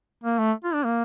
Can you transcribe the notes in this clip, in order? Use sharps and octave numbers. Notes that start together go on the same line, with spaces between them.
A#3
A3
F4
D4
A#3